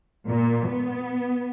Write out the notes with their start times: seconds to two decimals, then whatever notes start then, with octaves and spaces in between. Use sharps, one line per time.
0.28 A#2
0.67 B3